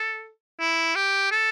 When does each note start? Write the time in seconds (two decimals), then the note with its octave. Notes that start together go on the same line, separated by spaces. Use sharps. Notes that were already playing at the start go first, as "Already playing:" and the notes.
Already playing: A4
0.60 E4
0.95 G4
1.31 A4